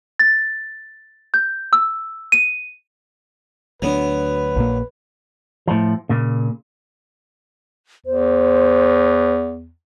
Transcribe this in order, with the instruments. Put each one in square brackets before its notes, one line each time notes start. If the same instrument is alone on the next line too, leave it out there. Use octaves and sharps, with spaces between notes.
[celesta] A6
G6
E6
D#7
[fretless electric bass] D2 G#3 D4 [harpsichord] F#3 B3 [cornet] B4
[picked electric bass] A#1 A#2 A#3
[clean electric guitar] A2 F3
A#2 C#3
[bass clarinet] E2 [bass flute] C5